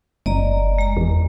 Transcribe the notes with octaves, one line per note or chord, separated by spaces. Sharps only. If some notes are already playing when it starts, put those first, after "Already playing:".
F#1 D5 D#5 A#5
G#3 A#5
E2